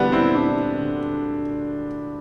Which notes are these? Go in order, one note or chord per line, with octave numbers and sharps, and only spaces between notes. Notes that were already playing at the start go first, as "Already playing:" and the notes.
Already playing: D2 G3 B3 D4 E4 G4
C4 E4
D4
D3